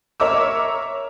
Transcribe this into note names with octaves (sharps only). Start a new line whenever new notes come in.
A#4 C#5 E5 A#5 D6 E6